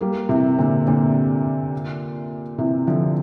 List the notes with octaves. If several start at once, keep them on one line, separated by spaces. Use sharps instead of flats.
G3 A#3
C3 E3
A#2 D3
A#2 D3
C3 E3
D3 F3